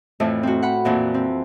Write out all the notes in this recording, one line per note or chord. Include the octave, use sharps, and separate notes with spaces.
F2 A2 E3 A3
C4 F#4
F#5 B5
F2 A#2 E3
C4